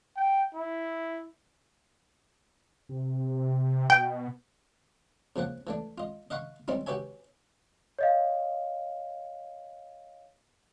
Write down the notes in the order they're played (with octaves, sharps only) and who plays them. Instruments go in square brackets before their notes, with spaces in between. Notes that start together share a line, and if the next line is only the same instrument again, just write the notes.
[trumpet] G5
E4
[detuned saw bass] C3
[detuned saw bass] B2 [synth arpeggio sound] G5
[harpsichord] C#3 F3 A#3 F#5
E3 A3 D4
F4 D#5
D#5 F5 F#5 B5 C#6
D#3 G3 C4 C#4 D#4 E4
F#4 G4 B4 C#5 E5 G#5
[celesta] C#5 D#5 F5